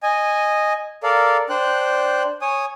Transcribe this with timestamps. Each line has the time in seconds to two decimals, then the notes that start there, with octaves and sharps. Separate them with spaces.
0.03 D#5 G#5
1.03 A4 A#4 D5 F5
1.49 D4 C5 G5 F#6
2.41 C#5 G#5 D#6